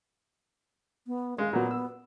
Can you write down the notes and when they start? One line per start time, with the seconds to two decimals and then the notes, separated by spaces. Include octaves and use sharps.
1.07 B3
1.38 G#3 F5
1.53 A#2 F#3 B3
1.71 E6